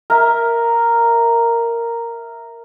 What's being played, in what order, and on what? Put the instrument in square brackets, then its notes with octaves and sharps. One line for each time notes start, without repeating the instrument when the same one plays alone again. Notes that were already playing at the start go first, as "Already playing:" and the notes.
[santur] A#4 E5